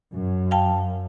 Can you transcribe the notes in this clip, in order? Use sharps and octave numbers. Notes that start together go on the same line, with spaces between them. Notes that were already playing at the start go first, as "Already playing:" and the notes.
F#2
F5 G5 A5